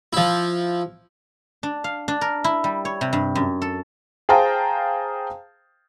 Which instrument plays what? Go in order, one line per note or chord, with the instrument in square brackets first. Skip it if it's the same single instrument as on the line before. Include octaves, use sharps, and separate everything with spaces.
[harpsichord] F3 E4
[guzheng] D4
F5
D4
A#4
E4
G3
C#5
C3
G2
F#2
A4
[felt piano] G#4 C5 F5 G5 A5 A#5